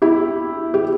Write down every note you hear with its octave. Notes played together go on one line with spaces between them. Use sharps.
E4 G4
G4